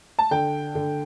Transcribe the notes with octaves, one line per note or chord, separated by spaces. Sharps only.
A5
D3 G5
D3